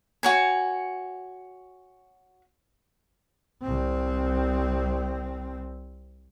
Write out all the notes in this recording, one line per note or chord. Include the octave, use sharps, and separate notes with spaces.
F#4 C#5 G#5
C2 C4